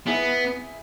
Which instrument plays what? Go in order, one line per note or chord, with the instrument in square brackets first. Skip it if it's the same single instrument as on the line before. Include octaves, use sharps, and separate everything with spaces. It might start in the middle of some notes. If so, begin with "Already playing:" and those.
[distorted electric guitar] B3 [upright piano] E4 G#4